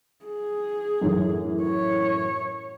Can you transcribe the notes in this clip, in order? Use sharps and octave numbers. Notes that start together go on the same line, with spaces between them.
G#4
F#2 A2 E3
C#5